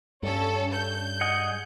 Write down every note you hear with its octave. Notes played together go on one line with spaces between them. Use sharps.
G2 C#4 A4
G6
G#4 D#5 F#5